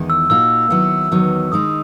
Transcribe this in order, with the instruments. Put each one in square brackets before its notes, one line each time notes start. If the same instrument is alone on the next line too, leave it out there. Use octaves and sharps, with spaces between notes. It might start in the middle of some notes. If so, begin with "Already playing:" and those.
Already playing: [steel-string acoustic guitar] E2 D#3 G#3
[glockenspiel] E6
[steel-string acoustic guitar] A#2 A#3 D#4 F#4 [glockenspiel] E6
[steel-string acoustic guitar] D#3 F#3 B3 E4
[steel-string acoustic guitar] E2 D#3 F#3 B3 [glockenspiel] E6
[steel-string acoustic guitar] D#3 G#3 D#4 [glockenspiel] D#6